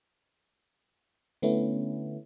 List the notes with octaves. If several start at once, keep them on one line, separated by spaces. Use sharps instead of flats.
D3 A3 B3 C#4 E4